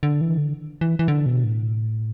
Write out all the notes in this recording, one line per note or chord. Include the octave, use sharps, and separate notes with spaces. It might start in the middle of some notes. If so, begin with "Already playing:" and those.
D3
E3
D3
E3
E3
D3
B2
A2